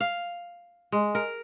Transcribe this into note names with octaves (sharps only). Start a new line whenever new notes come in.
F5
G#3
A#4